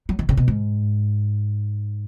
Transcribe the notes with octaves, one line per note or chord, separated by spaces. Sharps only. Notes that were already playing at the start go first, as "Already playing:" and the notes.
F#3
D#3
C#3
B2
G#2